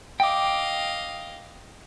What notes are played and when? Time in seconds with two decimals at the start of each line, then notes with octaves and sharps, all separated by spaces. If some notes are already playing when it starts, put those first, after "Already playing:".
0.20 D#5 F5 G5 D6